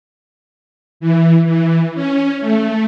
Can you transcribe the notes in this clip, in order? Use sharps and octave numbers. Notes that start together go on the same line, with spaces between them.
E3
E3
C#4
A3